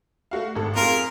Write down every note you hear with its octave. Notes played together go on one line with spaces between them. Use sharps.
A3 F#4 F5
G#1 A4
F2 F4 G#4 A#4